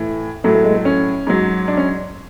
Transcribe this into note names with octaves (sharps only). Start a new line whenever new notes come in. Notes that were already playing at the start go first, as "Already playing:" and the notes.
Already playing: A2 E3
A2 F#3 A3
A3
G#3
A3
C#4
G#2 F#3
D4
C#4